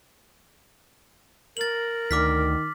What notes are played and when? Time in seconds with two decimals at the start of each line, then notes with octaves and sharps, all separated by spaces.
1.57 A#4 A6 F#7
2.11 D2 D#3 D6 F6 B6